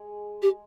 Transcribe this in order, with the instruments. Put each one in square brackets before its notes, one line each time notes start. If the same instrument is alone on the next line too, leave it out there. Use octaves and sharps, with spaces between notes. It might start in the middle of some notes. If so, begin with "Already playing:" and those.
Already playing: [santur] G#3
[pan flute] G4